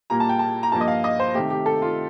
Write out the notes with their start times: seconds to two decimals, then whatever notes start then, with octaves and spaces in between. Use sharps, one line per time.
0.10 A#2 G3 A#3 A#5
0.20 A5
0.29 G5
0.39 A5
0.63 A#5
0.72 G2 F3 A#3 A5
0.81 D#5
0.88 F5
1.04 D#5
1.20 C5
1.35 C3 D#3 A3 G4
1.50 G4
1.66 A4
1.82 F4